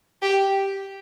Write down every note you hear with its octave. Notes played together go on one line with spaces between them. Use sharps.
G4